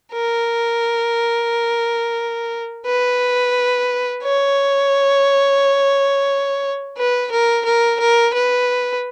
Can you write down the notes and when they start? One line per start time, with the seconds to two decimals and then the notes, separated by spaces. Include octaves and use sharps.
0.12 A#4
2.86 B4
4.23 C#5
6.97 B4
7.31 A#4
7.65 A#4
8.00 A#4
8.34 B4